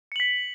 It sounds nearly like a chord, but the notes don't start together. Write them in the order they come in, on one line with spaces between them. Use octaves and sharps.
C#7 F#7 B6